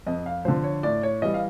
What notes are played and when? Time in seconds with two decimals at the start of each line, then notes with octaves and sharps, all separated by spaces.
0.07 F2 D#5
0.26 F5
0.45 D3 F3 C5
0.64 C#5
0.83 A2 D5
1.03 C#5
1.22 E3 G3 D#5
1.34 F5